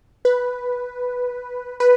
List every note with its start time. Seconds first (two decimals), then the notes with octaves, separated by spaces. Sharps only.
0.25 B4
1.80 B4